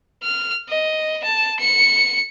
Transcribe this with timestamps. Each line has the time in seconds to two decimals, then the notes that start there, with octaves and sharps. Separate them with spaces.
0.23 F6
0.69 D#5
1.24 A5
1.60 C#7